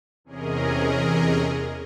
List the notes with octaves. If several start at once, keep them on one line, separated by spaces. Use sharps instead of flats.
E2 C3 C#4 G#4 A#4 D#5